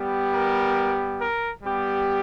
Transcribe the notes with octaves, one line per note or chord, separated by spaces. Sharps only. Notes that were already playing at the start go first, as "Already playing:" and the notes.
Already playing: G3 B3 G4
A#4
A#4
G3 B3 G4